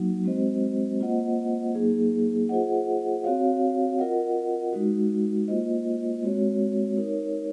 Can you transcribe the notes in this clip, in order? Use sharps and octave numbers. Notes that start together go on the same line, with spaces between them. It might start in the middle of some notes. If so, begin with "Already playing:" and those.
Already playing: F#3 A#3 D#4 F#4
G#3 C4 F#4 C5 D#5
A#3 F4 C5 D#5 F#5
F#3 A#3 D#4 G#4
F4 G#4 C5 D#5 F#5
C4 F#4 C#5 F5
F4 A#4 D#5 F#5
G#3 D#4 F#4
A#3 F4 C5 D#5
G#3 C4 F#4 C#5
D#4 A#4 C#5